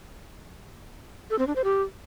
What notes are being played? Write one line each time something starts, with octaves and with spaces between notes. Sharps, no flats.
A4
C4
D4
C5
G4